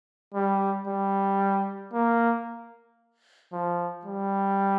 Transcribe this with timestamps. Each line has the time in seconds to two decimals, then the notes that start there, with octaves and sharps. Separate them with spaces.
0.34 G3
0.87 G3
1.93 A#3
3.53 F3
4.05 G3